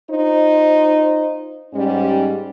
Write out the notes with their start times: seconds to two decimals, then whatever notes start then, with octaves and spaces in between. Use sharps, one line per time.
0.11 D#4 F4 C5
1.74 G#2 G3 C#4